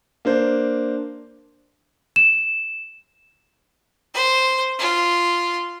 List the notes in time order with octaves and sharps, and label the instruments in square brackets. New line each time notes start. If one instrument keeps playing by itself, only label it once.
[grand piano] A#3 D4 C5
[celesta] E7
[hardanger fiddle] C5
F4